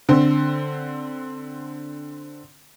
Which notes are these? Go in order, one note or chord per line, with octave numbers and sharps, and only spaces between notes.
D3 C4